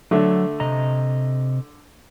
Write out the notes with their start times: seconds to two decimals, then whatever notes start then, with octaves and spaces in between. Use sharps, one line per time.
0.11 D3 F#3 A3
0.60 C3 D#5 A#5